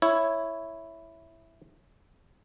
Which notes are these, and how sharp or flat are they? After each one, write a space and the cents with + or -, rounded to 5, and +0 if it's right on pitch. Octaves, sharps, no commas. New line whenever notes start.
E4 +0 C#5 +0